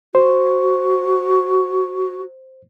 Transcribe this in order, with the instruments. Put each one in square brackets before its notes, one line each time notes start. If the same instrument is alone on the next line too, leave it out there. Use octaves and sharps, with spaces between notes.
[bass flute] F#4 [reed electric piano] C5